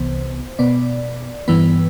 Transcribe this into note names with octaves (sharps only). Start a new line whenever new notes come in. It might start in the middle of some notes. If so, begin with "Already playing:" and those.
Already playing: C2 C3 E3 B3 C5
B2 B3 D5
G2 E3 B3 B4